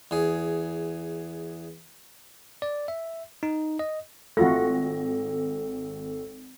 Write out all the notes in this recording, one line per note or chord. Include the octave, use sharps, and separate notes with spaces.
E2 G#4
D5
E5
D#4
D#5
G#1 A3 F4 F#4 A4 A#6